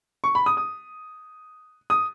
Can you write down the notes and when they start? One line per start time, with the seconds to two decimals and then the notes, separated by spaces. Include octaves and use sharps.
0.24 C#6
0.35 B5
0.46 D#6
0.57 D#6
1.90 D#6